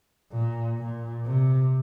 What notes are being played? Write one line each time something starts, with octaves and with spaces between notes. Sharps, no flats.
A#2
A#2
C3